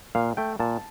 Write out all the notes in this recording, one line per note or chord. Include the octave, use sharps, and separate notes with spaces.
A#2 F5
A3 G5
A#2 A5